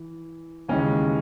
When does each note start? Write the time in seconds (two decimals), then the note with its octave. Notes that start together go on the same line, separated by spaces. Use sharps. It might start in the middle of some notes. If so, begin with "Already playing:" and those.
Already playing: E3
0.69 D#2 C#3 E3 G#3 C#4